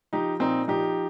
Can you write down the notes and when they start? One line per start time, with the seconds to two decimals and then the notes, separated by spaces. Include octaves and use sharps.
0.13 F3 D#4 G4
0.40 A#2 C4 D#4
0.68 F3 D#4 G4